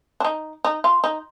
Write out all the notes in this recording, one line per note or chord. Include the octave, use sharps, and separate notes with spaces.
D4
D#4
D#4
F4
D#4